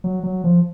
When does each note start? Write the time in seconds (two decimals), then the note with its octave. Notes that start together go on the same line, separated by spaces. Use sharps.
0.04 F#3
0.23 F#3
0.44 F3